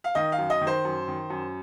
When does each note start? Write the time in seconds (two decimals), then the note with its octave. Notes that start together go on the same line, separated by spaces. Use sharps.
0.04 F5
0.15 D#3 D#5
0.32 F5
0.38 F#2
0.50 D#5
0.61 D#3
0.67 C5
0.85 F#2
1.08 D#3
1.30 F#2